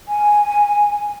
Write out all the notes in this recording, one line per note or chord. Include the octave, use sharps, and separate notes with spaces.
G#5